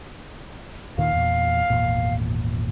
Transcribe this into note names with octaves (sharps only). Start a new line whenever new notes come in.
D#2 A#2 D#3 F5
E2 A#2
G#1 E2 A#2